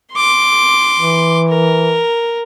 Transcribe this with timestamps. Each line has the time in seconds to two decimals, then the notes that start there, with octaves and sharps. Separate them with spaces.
0.14 C6 D6
0.99 E3
1.49 A#4